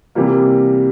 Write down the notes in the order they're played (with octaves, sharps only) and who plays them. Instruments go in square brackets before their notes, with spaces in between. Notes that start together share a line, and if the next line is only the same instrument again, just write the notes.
[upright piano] C3 E3 G3 A#3